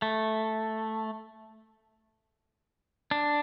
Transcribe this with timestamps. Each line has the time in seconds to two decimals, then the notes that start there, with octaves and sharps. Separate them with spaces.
0.02 A3
3.11 D4